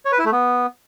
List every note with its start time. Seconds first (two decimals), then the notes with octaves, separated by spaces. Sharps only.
0.05 C#5
0.12 B4
0.19 E4
0.25 A3
0.32 B3